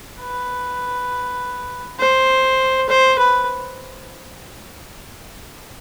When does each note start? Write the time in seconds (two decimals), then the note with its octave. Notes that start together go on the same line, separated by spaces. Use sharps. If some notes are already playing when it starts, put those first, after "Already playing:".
0.21 B4
2.00 C5
2.89 C5
3.19 B4